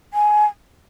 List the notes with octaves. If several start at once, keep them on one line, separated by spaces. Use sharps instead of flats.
G#5